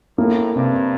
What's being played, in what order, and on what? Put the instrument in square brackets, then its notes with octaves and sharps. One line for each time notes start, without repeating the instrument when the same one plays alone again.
[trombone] A2 [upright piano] A#3
[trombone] G2 [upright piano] C3